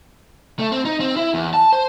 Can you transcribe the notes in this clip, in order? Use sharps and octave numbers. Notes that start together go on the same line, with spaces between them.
A3
C4
D#4
C4
E4
E2
A5
C5